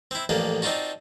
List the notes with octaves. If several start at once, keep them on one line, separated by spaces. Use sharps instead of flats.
C4 E4
A1 F2 A#3 D4
C4 D4 D#4 F4 F#4